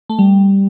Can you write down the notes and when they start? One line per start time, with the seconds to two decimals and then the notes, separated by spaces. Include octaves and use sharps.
0.09 A3
0.19 G3